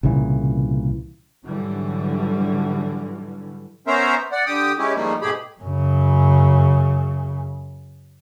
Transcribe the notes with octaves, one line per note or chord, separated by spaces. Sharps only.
C2 A#2 C#3 E3
G#2 D3 E3 F#3 G3
B3 C#4 A#4 C5 E5 A#5
D5 F#5
D3 G4 G5 D#6
G#3 C#4 E4 G4
G#2 D#3 F3 G3 A3 A#3
G#2 B2 A3 G4 G#4 B5
F#2 C#3